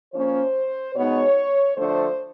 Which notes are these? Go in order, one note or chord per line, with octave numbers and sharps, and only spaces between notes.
F3 A#3 C#4 C5
B2 G#3 B3 D#4 C#5
D3 F3 A3 D4 C5